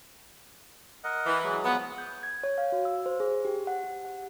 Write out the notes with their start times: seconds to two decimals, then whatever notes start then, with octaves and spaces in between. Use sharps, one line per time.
1.04 A#4 D#5 F#5
1.26 E3
1.43 F#3 G#3
1.65 F3 B3
1.98 G6
2.23 G#6
2.44 C#5
2.58 F5
2.72 F#4
2.85 E6
3.06 C5
3.20 G#4
3.45 G4
3.67 F#5
3.84 G4
4.05 F#5